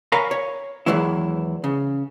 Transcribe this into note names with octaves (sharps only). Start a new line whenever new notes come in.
A#4 C#5 F5 G#5 A#5 B5
C#5
E2 D#3 E3 F#3 G#3 E4
C#3